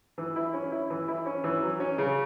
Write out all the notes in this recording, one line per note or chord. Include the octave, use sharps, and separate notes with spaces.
E3
E4
C#4
E4
E3
E4
C#4
E3
F#3
C#4
C#3